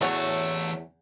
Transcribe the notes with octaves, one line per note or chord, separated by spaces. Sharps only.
E2 E3 F#3 A3 C#5